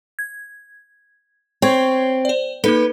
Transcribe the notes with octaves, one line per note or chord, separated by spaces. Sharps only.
G#6
C4 C#5 C#6 G#6
C5 D5
A#3 D#4 A4 B4